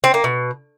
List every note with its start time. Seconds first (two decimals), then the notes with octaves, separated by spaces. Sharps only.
0.04 C4
0.14 A#3
0.24 B2